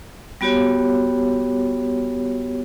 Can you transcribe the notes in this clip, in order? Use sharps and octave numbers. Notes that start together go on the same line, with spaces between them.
G3 B3 F#4 G4 C#5